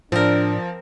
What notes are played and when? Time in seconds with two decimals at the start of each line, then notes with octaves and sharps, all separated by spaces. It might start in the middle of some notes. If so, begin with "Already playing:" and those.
0.12 A2 F3 C4 D4 A#4